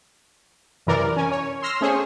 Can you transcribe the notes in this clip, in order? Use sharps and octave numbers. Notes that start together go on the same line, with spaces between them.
F#2 C3 E3 A#4 D5
C#4 G#5
C#5
C6 E6 F6 A#6 C7
A3 C#4 G#4 C5 C#5